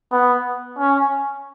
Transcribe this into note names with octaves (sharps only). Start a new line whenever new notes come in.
B3
C#4